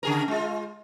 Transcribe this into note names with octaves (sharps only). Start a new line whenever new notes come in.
C#3 G#4 A#4
G#3 F4